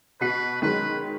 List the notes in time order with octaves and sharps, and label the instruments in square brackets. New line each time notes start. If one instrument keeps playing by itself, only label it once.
[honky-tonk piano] B2 F#4 C7 [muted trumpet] B4
[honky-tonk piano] D#3 F#3 G#3 [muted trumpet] B4